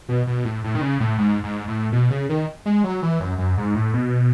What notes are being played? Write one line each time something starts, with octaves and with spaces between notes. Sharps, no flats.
B2
B2
A2
A2
D#3
C#3
A2
G#2
G#2
A2
B2
C#3
D#3
G#3
F#3
E3
F#2
F#2
G#2
A2
B2